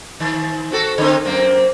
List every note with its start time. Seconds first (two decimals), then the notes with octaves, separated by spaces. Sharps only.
0.20 D#3
0.71 C4 F#4 A4
0.98 D3 C4
1.25 F#2 A#3 C4